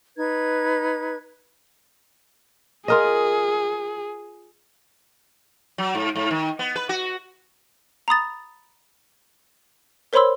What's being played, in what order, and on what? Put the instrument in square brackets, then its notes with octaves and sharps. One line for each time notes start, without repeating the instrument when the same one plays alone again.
[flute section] D#4 B4 G#6
[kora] F4 A#4 D#5 [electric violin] G#4
[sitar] F#3
G#2
G#2
D#3
B3
B4
F#4
[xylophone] A#5 B5 D#6 A6
A#4 C5 C#5 B5 C6 E6